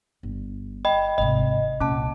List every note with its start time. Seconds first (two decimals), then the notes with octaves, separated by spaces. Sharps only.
0.23 G1
0.85 D#5 G5 B5
1.18 G#1 C3 D#5
1.80 C2 A#2 C#4 A5